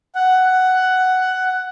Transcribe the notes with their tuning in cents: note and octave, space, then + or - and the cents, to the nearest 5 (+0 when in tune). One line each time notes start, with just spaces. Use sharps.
F#5 +10